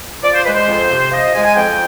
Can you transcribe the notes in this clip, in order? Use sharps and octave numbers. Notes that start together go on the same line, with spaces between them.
F3 D5
C5
G#3 B4
C5
F2
C3
F3 D#5
G#3 G#5
G#5
F2 G5